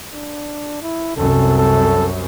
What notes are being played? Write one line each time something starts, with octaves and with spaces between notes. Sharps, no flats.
D4
E4
C2 F#2 C3 A4
A4